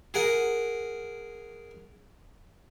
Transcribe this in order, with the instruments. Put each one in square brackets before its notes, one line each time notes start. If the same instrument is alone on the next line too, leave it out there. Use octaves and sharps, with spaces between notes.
[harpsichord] G#4 A#4 F#5